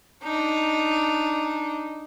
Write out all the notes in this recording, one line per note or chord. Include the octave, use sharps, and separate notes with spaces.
D4 D#4